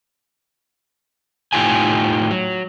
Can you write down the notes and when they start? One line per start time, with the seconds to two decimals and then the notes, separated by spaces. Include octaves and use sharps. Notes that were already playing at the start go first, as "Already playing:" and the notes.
1.53 A2 D#4 F4 G4 G#5
2.30 F#3